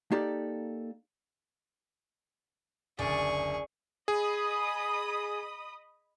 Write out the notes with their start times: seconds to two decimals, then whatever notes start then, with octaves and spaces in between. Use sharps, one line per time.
0.12 A#3 D#4 G4 A4 D5
2.99 F#1 D2 G#4 D5 C#6
4.08 G#4 D#5 B5 D#6